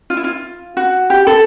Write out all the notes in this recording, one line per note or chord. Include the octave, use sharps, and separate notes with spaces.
F4
E4
F4
F#4
G4
A4